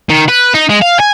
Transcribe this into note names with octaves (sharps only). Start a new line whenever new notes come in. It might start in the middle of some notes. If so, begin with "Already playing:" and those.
D#3
B4
D#4
G#3
F5
G#5